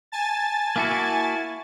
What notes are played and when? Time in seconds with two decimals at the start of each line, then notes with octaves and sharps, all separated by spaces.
0.12 G#5 A5 A6
0.76 A#3 E4 F#4